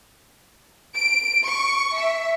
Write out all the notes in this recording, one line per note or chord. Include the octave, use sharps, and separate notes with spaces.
D7
C#6
E5